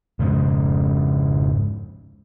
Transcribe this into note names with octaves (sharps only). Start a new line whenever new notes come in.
F2 G#2 C#3 G#3